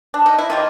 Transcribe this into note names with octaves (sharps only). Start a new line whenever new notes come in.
D4
D#4
E4
D#3 G3 A#3 F4